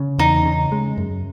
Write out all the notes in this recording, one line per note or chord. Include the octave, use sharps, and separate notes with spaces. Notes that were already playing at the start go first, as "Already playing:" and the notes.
Already playing: C#3
E2 D#4
C#3
G#3
F#2